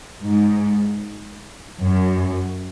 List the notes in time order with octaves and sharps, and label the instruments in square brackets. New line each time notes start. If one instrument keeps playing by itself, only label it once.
[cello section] G#2
F#2